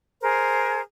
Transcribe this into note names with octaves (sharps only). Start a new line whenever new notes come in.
G#4 A#4 C5